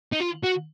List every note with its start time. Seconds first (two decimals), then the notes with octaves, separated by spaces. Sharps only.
0.12 D#4
0.20 F4
0.43 F#4